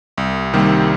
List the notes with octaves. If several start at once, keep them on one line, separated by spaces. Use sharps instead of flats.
C2
C3 D#3 G3 A#3